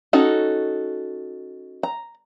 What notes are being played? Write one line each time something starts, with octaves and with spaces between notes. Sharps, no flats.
C#4 D#4 F#4 A4
A#5